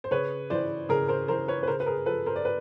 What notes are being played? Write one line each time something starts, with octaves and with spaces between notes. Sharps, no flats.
C5
C#3 B4 C#5
E3 C5 D5
C#3 G#4 A#4
A#4 C5
E3 A#4 C5
B4 C#5
B4
C#3 A#4 C5
B4
G#4 A#4
F3 A4 B4
A#4 C5
D5
B4